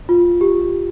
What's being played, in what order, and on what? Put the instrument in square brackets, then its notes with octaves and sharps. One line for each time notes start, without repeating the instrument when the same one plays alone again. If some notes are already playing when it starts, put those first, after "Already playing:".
[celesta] F4
G4